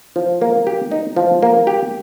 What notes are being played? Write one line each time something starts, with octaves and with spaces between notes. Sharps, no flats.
F3
A#3
G4
D#4
F3
A#3
G4